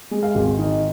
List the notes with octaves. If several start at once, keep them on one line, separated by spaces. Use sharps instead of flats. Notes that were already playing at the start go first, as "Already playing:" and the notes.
G#3
F5
G#1
D#3 D#5